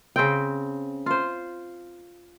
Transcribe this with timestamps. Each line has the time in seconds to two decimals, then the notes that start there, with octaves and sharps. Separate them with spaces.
0.16 C#3 C4 G5
1.06 F4 C5